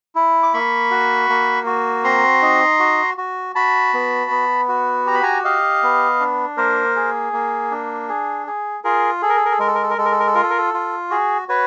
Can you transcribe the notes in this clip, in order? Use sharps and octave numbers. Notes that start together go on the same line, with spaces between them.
E4
D6
A#3 B5 C#6
F#4
A#3
F#4
C4 A#5 C6
D#4
F#4
F#4
F#4 A5 B5
B3
B3
F#4
G4 A#5
B5
G#5 A#5
G4 D#5 F5
B3
D4
A#3 A#4 C5
G#4
A#3
D4
G#4
G#4
F4 G#4 A#4
G#4 A4
A#4
A4
A#4
A4
G#3 A#4
A4
A#4
A4
A#4
G#3 A4
A#4
A4
A#4
A4
F4 A#4
A4
A#4
A4
F4
F#4 G#4
F#4 B4 C#5